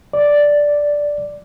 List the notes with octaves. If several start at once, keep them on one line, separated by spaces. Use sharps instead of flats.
D5